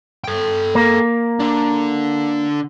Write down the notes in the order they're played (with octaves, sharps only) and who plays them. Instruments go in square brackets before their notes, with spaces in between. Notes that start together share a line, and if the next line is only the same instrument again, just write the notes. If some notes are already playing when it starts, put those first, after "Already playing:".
[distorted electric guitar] A4 G5
[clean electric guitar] A#3
[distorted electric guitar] D3 D4